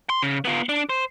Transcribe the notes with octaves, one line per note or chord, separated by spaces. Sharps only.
C6
C#3
B3 F4
D4
C5